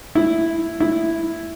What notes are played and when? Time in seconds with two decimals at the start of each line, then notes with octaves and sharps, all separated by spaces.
0.15 E4
0.80 E4